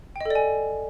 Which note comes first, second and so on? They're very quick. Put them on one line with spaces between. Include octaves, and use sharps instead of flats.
G5 D#5 A4 D5 G#5